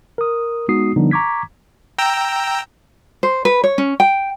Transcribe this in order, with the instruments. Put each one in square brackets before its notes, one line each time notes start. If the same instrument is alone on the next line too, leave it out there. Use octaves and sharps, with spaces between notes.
[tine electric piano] A#4 D#6
G#3 B3 D#4 F#4 D#6 C7
D3 F3 G3 B3 D4 D#4
A#5 C#6 D6 G#6 B6
[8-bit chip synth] G5 A#5 E6
[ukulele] C5
B4
C#5
C#4
G5